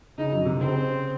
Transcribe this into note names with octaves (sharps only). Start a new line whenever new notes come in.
C#3 D#4
F#2
C3
C#3 C4